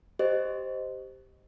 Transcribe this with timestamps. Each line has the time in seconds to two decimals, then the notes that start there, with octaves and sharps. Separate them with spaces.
0.19 G4 C5 D#5